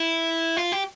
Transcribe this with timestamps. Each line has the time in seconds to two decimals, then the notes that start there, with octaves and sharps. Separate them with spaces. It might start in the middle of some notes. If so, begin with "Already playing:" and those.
Already playing: E4
0.57 F4
0.72 G4